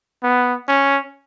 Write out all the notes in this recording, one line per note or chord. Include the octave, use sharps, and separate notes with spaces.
B3
C#4